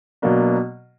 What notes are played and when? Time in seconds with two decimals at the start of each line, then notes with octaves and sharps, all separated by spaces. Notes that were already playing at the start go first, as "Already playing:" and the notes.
0.22 B2 F#3 A#3 D4